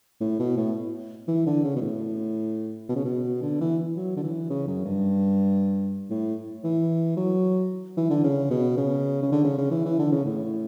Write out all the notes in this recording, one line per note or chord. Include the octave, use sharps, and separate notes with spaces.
A2
B2
A2
E3
D3
C#3
B2
A2
B2
C#3
B2
D3
E3
F#3
D3
E3
C#3
F#2
G2
A2
E3
F#3
E3
D3
C#3
B2
C#3
C#3
D3
C#3
C#3
E3
E3
D3
C#3
A2